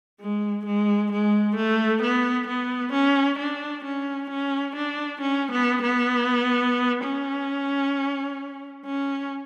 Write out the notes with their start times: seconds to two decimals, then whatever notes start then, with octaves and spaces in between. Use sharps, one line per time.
0.20 G#3
0.66 G#3
1.12 G#3
1.56 A3
2.02 B3
2.47 B3
2.93 C#4
3.39 D4
3.85 C#4
4.30 C#4
4.76 D4
5.21 C#4
5.52 B3
5.82 B3
7.04 C#4
8.85 C#4